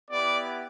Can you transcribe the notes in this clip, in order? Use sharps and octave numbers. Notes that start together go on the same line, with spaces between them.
B3 E4 G4 D5